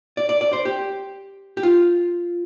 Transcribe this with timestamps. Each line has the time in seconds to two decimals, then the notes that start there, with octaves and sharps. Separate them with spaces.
0.17 D5
0.29 D5
0.41 D5
0.53 C5
0.65 G4
1.57 G4
1.63 F4